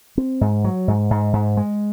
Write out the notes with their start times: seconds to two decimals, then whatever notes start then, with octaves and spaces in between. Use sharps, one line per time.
0.18 C4
0.41 G#2
0.64 F#3
0.88 G#2
1.11 G#2
1.33 G#2
1.57 G#3